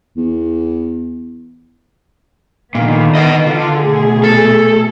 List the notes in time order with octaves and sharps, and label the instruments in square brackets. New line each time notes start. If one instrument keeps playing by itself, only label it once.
[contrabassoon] E2
[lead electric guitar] A#2 [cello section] D3 D#3 B3
[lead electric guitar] B4 D#5
[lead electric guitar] D3 [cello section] F4
[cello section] B2 A3 G#4
[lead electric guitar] A4